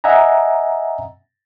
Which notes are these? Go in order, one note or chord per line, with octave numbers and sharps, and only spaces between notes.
D#5 E5 F#5 G#5 A#5